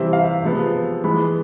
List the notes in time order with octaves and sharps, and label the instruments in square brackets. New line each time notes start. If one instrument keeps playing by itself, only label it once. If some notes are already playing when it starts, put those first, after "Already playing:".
Already playing: [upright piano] C3 E3 G3 C4 E5
F5
C3 F3 G#3 B3
E3 G#3 B3 B5